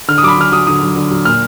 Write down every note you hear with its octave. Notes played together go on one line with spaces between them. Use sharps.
D3 F6
D#6
F#3 B5 D6
D3 F6
F#3 D#6
D3 D#6
F#3
D3
F#3
A#2 F6